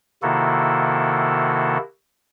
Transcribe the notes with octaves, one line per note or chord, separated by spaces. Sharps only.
C3 D#3 A#3 E4 F#4 A4